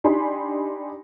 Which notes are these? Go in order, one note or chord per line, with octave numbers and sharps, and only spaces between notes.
D4 D#4 G4 G#5 B5 C6